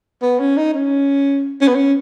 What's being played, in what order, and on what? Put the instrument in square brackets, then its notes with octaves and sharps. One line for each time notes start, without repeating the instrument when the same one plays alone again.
[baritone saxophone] B3
C#4
D#4
C#4
C#4
B3
C#4